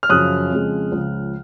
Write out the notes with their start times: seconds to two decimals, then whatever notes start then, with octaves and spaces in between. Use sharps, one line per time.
0.03 F6
0.10 F#2 C#3 F3 D#6 F#6
0.51 F2 C#3 F3 G#3
0.92 C#2 C#3 F3